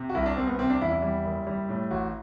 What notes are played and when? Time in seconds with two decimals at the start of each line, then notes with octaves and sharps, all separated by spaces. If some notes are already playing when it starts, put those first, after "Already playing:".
Already playing: C3
0.09 F#4
0.15 C2 E4
0.26 D4
0.37 C2 C4
0.47 B3
0.59 C3 C4
0.70 D4
0.81 E2 E4
0.92 E4
1.02 G3
1.25 F#1
1.47 G3
1.69 A2
1.91 A1 F#4